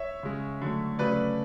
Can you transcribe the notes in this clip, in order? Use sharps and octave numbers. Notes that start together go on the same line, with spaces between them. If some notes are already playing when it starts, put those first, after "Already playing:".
Already playing: C#5 E5
C#3 G#3
D3 F#3 A3
C#3 F#3 A3 B4 D5